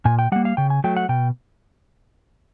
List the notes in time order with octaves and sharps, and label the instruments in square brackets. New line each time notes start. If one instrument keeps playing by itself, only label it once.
[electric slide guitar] A#2 G#5
G5
G3 A#3 F#5
F5
C#3 G5
G#5
F#3 A3 G5
F#5
B2 G5